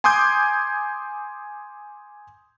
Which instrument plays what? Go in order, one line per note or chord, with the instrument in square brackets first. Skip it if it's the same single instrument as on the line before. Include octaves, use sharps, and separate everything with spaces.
[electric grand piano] G#5 C6 D6 D#6 G6 G#6